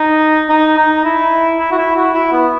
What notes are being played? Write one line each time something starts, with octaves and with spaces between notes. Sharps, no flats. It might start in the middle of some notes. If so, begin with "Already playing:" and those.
Already playing: D#4
D#4
D#4
E4
E4
F#4
E4
F#4
E4
B3